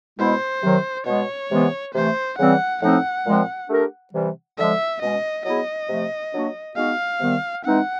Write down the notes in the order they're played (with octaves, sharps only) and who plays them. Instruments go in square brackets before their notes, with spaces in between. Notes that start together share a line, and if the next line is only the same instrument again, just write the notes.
[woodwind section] B2 G#3 B3 E4 [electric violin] C5
[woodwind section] C3 D#3 F#3
[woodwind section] B2 G#3 B3 [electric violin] C#5
[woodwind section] C3 E3 G#3 B3
[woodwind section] C3 E3 A3 [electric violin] C5
[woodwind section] C#3 E3 G3 C4 [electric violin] F#5
[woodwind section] A2 F3 A3 C4 D#4 [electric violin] F#5
[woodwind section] A#2 F3 G#3 C4
A3 D4 G4 A#4
C3 E3 G3
[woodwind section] D3 F3 G#3 [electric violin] E5
[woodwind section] B2 G#3 C#4 [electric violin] D#5
[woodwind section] F#3 B3 E4 G#4 [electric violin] D#5
[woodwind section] C3 F3 A3
F#3 A#3 D4 F#4
[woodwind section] G#3 B3 D#4 F#4 [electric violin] F5
[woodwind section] C3 D#3 G3 B3
[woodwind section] E3 G#3 C4 D#4 [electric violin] F#5